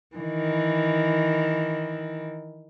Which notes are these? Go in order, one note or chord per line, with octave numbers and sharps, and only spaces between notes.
D#3 E3